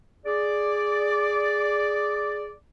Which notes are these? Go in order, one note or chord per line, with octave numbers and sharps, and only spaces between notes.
G#4 D5